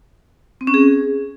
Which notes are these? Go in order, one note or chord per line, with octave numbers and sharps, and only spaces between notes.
C4
C#4
G#4